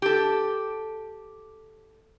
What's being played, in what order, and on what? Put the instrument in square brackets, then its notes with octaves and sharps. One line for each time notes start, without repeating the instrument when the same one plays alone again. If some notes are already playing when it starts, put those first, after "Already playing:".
[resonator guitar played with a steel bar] G4 A4